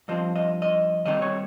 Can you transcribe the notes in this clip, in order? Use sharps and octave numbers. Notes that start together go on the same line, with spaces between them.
G2 F3 C4 D#5
D#5
D#5
D#2 D#3 G3 C4 D#4 D#5
C#5